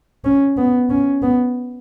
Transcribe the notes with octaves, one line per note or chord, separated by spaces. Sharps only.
C#4
B3
C#4
B3